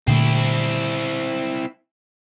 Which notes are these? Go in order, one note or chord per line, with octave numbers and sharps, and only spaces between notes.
A#2 D3 A3 C4 E4